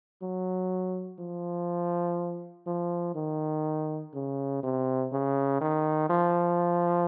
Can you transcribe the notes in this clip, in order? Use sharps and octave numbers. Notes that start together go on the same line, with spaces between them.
F#3
F3
F3
D#3
C#3
C3
C#3
D#3
F3